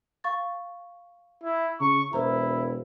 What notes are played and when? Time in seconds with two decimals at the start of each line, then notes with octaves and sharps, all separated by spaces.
0.24 F5 C#6 A6
1.43 E4
1.81 C#3 A#5 C#6
2.13 E1 E4 A#4 C5 A#5